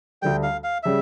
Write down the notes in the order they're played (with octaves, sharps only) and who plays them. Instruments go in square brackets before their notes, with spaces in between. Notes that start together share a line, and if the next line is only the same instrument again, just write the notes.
[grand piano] D2 D3 G3 [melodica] G5
[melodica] F5
F5
[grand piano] C#3 G3 [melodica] E5